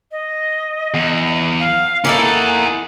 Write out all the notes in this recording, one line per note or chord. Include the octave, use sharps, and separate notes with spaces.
D#5
E2
F5
A#3 C#4 D#4 E4 A4 G#5
E4 F#5